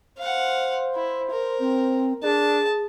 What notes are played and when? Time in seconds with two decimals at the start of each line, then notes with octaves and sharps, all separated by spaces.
0.18 C5 F5 F#5
0.95 E4
1.31 A#4
1.60 C4
2.23 D4 G#4 A5